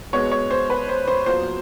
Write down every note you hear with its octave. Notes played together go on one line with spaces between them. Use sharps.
B2 G#3 B3 C#5
C#5
C5
B4
C5
C5
A#2 F#3 B3 C5